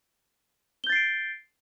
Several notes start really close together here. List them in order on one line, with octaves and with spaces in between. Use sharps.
G7 G6 A6 C7 D7